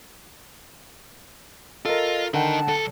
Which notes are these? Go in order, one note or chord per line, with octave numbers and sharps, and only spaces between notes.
F4 A4 A#4 D#5
D3 D#4 A#4 F#5 G5 A5
B1 A4